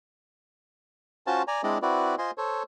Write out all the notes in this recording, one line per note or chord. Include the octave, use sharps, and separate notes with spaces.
C#4 F4 F#4 C5 A5
D5 G#5 A#5
G#3 C4 D4 E4 D5 D#5
C4 E4 F#4 B4 D5
F4 C5 D#5 G#5 C6
A4 C5 C#5